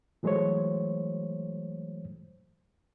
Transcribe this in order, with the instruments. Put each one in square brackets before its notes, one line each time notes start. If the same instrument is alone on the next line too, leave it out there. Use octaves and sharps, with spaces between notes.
[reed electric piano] E3 F#3 G#3 A3 C5 C#5